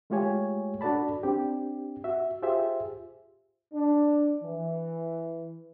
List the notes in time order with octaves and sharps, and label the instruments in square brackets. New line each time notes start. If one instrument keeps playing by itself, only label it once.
[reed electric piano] G#3 A3 F4 G4 C#5 G#5
D4 F#4 A4 D5 A5 B5
C4 D4 G4
F#4 E5
F4 G4 G#4 C5 E5
[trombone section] D4
E3